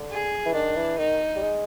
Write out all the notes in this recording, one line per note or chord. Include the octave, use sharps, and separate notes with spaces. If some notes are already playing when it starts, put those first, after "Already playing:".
Already playing: D3
G#4
E3
D#3 D4
E3
D#3 D#4
G3
G#3